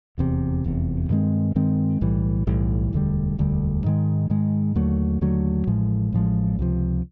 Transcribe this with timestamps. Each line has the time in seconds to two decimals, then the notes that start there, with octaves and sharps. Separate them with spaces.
0.18 F1 E2 C3
0.64 F1 E2 C3
1.10 G2 D#3 G#3 C4
1.55 G2 D#3 G#3 C4
2.01 B1 A2 E3 G3
2.47 B1 A2 E3 G3
2.93 E1 D2 D3 G3
3.38 E1 D2 D3 G3
3.84 G#2 D#3 G#3
4.30 G#2 D#3 G#3
4.75 D#2 D3 F#3 A3
5.21 D#2 D3 F#3 A3
5.67 A1 A2 F3 G#3
6.12 A1 A2 F3 G#3
6.59 C#2 C3 F3